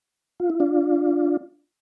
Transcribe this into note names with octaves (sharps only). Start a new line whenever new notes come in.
F4
E4
D4 F4